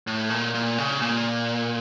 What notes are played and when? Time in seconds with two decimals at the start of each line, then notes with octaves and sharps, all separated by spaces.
0.07 A2
0.30 A#2
0.54 A#2
0.78 C#3
1.02 A#2